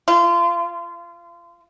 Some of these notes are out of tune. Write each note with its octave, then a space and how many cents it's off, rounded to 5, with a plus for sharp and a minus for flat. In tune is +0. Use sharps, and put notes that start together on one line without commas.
F4 -30